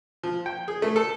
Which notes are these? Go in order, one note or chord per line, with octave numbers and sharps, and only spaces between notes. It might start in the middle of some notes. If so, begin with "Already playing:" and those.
F3
G5
G#4
A3
A4